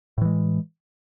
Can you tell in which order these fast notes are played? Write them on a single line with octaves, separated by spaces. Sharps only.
A2 E3 G#3